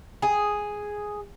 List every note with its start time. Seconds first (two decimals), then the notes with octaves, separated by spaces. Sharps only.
0.22 G#4